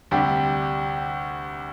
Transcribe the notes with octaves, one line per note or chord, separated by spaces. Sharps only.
D2 C3 G3 D4 G4